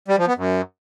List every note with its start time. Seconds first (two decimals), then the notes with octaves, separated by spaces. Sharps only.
0.08 G3
0.18 F3
0.28 B3
0.37 F#2